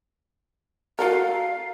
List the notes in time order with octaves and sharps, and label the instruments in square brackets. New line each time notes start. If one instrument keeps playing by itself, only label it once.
[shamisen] F#4 A4 A#4 [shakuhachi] F5